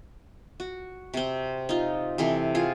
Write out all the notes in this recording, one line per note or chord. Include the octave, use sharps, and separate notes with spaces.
F#4
C3 C4
D#4 F4
C3 E3 A4 C6
F4 G#4